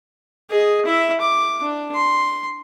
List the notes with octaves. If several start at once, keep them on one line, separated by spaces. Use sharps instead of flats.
G#4 D#5
E4 E5
D6
D4
C6